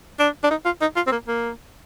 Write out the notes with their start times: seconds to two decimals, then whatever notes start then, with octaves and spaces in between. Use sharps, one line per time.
0.19 D4
0.44 D4
0.50 D#4
0.65 F4
0.81 D#4
0.96 F4
1.07 C4
1.12 A#3
1.28 A#3